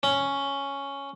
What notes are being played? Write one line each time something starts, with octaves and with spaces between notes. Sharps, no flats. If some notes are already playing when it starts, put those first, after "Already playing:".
C#4